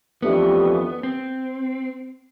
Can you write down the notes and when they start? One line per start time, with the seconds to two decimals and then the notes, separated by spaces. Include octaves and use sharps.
0.22 F2 E3 A3 B3 D4 G4
1.03 C4